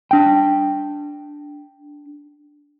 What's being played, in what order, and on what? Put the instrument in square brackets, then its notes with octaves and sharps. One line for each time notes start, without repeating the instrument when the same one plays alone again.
[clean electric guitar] D4 G5